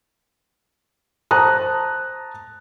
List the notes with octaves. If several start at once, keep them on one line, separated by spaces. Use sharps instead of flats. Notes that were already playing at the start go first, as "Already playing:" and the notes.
C5 A5 A#5 D#6 F#6